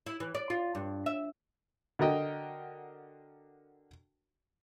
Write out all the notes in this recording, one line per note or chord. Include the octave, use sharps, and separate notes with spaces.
E4
E3
D5
F4
G2
E5
D3 F#4 A#4 D#5 G5